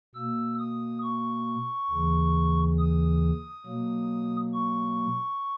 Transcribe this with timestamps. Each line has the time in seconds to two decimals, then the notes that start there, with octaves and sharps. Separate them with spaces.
0.15 B2 A#3 E6
0.59 D#6
1.02 C#6
1.90 D#2 C#3 E3
2.78 D#6
3.66 B2 F#3 A#3
4.53 C#6